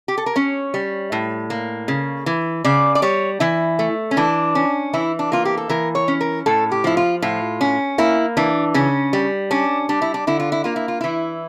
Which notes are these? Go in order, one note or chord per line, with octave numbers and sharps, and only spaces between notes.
G4
A4
A#4
C#4 C#5
G3
A2
A#3
C#3
E3
C#3 D5
D5
G3 C#5
E3 E4
A3
C#4
E3 D4
C#4
E3 E4
D4
A#3 F4
G4
A4
E3 A#4
C#5
C#4
A#4
A2 A4
G4
F3 E4
F4
A2 F4
C#4
A#3 E4
E3 D4
C#3 C#4
G3
C#4 D4
G3 D4
E4
D4
D3 E4
F4
E4
A#3 F4
E4
F4
E3 E4